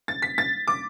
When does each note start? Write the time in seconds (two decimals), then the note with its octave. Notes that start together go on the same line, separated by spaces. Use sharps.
0.08 A6
0.22 B6
0.38 A6
0.67 D6